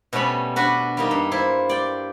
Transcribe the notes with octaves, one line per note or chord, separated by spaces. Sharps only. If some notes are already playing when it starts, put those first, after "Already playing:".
B2 G3 A3 C#4 B5
D4 F#4 B4
G3 A#3 D#4
G2
E4 F4 C5
D5 G5